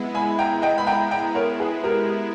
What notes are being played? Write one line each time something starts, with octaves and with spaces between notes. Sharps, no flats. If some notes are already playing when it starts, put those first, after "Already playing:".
Already playing: G#3 B3 E4
G#5 B5
G5 A#5
D#5 G5
B5
G5 A#5
G5 A#5
A#4 C#5
G#4 B4
G4 A#4